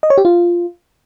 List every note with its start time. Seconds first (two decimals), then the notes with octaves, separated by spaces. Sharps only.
0.03 D#5
0.10 C#5
0.18 G4
0.25 F4